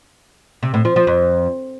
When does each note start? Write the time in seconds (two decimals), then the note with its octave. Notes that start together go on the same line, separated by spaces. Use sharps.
0.63 C3
0.74 A2
0.85 F3
0.96 F3
1.07 F2